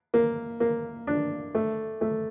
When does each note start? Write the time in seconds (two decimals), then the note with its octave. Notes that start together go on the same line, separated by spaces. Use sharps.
0.14 A#3
0.60 A#3
1.07 D4
1.55 A3
2.01 A3